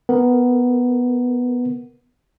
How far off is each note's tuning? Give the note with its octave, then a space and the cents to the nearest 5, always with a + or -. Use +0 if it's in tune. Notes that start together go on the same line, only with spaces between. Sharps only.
B3 +0 A#4 +0